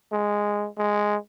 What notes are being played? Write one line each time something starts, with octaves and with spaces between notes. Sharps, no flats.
G#3
G#3